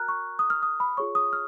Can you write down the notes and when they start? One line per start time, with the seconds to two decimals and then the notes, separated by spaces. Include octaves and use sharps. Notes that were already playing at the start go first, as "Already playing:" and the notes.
Already playing: F#4 A#4 A#5 F6 F#6
0.08 C#6
0.39 D#6
0.50 F6
0.63 D#6
0.80 B5
0.97 F4 G#4 C#5 C#6
1.15 D#6
1.33 F6